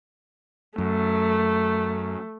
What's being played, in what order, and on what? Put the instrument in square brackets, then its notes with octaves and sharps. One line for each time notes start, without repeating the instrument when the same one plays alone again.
[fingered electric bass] F#2 [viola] A3